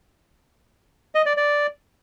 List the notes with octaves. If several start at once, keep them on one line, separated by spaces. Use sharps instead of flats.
D#5
D5
D5